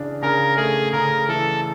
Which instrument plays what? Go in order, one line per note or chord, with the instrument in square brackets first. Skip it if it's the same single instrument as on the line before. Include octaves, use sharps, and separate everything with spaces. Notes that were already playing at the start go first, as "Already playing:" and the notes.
Already playing: [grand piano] C#3 E3 D4
[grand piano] C#3 [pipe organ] A#4
[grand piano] A3 [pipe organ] G#4
[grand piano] C#3 [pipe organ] A#4
[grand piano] E3 [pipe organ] A4